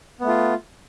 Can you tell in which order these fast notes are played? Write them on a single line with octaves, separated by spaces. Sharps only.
B3 A3 F4